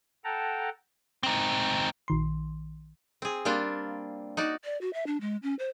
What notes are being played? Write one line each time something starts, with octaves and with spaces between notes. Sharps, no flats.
A4 F#5 G5 A5 A#5
C4 D#4
A#1 D#3 C6
C4 G#4
G3 A#3 C4 D4 F4
D#4 F#4 D5
D5
F#4
E5
D4
G#3
C#4
C5